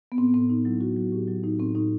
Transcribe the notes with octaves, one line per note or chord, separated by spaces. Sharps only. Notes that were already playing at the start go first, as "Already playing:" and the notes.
B3
A2 C4
A2 C4
A2 D#4
F#3 E4
A2 F#4
F#3
A2 G4
F#3
A2 D#4
A2 C4
A2 D#4